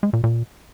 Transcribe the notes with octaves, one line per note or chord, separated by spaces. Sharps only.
G#3
A#2
A#2